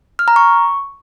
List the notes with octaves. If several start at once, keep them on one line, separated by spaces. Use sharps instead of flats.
F6
A#5
C#6